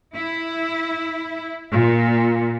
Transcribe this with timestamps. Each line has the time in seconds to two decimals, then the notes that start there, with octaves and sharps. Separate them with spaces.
0.15 E4
1.72 A#2